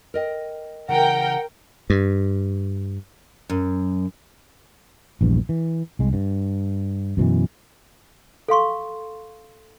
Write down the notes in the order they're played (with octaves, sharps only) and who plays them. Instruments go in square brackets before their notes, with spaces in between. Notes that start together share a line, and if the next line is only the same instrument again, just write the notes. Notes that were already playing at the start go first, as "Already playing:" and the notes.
[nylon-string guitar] A#4 D#5 G5
[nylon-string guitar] C#3 E3 [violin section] A#4 G5 [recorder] F#5
[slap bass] G2
[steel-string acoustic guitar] F#2
[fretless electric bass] A#1 E2 G2
E3
C2 G#3
G2
F#2 B2 E3
[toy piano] A4 F5 C6 C#6